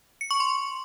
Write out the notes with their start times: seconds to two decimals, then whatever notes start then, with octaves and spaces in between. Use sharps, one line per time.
0.21 C#7
0.31 C#6
0.40 C6